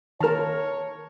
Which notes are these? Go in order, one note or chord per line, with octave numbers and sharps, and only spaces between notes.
D#3 A#4 C#5 A5 F6